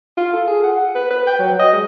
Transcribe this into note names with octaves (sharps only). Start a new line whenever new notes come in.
F4
A4
G#4
F#5
B4
B4
G5
F#3
D#5
G#3